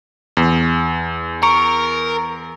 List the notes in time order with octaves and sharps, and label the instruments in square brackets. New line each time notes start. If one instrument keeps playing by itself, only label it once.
[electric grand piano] E2
[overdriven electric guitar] A#4 [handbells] A#5 C#7 D7 [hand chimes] C#6